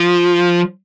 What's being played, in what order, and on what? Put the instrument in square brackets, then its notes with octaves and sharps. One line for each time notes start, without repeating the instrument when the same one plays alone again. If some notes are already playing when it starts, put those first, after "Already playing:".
Already playing: [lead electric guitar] F3